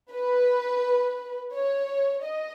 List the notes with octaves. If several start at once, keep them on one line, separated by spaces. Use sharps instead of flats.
B4
C#5
D#5